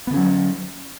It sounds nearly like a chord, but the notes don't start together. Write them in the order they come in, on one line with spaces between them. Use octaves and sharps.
B3 D3 C#4 F#3